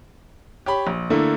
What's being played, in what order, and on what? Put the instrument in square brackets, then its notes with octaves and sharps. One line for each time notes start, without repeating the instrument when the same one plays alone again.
[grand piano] G4 C#5 B5
A#1
D3 A3 A#3 E4